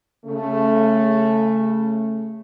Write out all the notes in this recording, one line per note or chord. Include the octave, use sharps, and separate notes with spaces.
C#3 A3